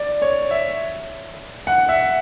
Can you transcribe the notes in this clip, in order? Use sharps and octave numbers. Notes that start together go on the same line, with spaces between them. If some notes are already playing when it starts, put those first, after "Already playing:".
Already playing: D5
C#5
E5
F#5
E5